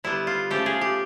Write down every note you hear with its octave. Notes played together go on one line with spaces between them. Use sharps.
D3 G3 B3 E4
F4
C#3 F3 A3 G4
G#4
G4